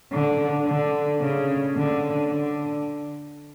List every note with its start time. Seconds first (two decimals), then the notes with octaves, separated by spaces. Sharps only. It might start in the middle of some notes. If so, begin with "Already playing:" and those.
0.12 D3
0.67 D3
1.21 C#3
1.76 D3
2.31 D3